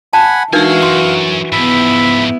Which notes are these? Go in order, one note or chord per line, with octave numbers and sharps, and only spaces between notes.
F#5 G#5 A5 B5
E3 G#3 D4 D#4 F#4 A#4 F5 G#5
F#2 C6
G#2 F3 B3 E4 E5 B5